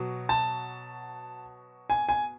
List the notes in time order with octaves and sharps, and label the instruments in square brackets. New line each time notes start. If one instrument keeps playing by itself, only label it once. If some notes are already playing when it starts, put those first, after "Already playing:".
Already playing: [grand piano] B2 F#3
A5
G#5
G#5